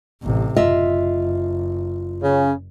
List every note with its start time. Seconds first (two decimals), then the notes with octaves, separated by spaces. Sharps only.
0.23 A1 C3
0.56 F#1 F4 D#5 E5
2.23 C#3